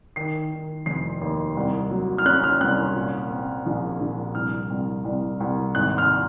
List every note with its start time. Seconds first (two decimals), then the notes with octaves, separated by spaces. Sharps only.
0.16 D#3 C7
0.51 D#3
0.86 F1 C7
1.21 D#2
1.57 C2
1.91 F#3
2.18 F6
2.26 C#4 F#6
2.43 F6
2.61 C2 F#6
2.95 A#2
3.31 C4
3.66 A#1
4.00 A#1
4.35 C2 F6
4.70 C2
5.05 C2
5.40 C2
5.75 G#1 F#6
5.98 F6